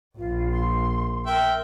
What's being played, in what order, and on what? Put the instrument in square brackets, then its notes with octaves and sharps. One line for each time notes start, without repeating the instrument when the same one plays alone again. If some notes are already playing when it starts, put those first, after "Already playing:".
[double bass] A#1 [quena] F4
[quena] C6
[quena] A#4 [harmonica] E5 G5